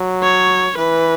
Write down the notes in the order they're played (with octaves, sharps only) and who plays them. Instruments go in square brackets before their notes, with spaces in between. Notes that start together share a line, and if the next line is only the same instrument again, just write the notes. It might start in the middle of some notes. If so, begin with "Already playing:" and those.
Already playing: [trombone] F#3
[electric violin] C#5
[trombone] E3 [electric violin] B4